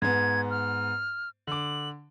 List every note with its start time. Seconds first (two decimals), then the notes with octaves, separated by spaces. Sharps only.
0.02 G#2 B3 G#6
0.50 F6
1.47 D3 D6 F#7